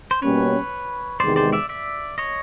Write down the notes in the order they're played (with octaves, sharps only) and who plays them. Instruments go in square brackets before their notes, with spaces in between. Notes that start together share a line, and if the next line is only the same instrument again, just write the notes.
[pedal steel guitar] C5
[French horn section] B2 G3 A#3 C#4 [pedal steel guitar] B4 C#5
[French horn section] E2 C3 D#3 G#3 [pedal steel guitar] C5 D5
[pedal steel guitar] C5 D5
D5 E5
D5 E5
C#5 D#5